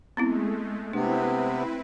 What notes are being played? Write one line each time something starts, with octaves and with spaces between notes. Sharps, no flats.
G#3 A3 B3 C4 E4
C3 B3 C4 D4 E4 B4